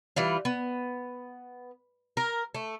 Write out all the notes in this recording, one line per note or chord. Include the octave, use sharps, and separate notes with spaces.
E3 G3 F4
B3
A#4
A3